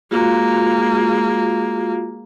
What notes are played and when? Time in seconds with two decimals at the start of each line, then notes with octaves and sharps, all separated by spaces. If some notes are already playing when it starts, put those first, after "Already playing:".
0.11 G#3 A#3 F4 F#4 F5